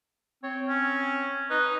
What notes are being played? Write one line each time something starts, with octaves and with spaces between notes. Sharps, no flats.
C4 C#5
C#4
D#4 B4